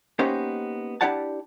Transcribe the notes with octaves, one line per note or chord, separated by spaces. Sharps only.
A#3 B3 C#4 D#4 G4 C5
D4 E4 G4 D5 F#5 A5